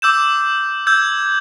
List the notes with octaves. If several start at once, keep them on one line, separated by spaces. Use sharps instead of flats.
D6 E6 G6 E7
E6 G6 G#6